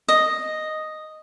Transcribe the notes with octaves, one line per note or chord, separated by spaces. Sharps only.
D#5